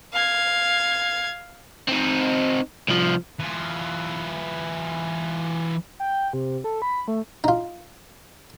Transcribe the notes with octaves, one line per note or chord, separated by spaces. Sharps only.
F5 G#6
C4 D#4
C2 F3
E3 F4
G5
C3
A4
B5
A3
D#4 F4